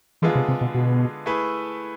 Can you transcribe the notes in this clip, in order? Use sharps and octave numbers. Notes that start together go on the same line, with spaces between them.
D3 E3 G#3 B3 F4 G#4
C3
C3
B2
B2
A3 E4 G#4 B4